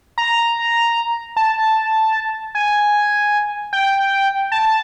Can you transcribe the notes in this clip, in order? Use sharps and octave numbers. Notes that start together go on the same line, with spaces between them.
A#5
A5
G#5
G5
A5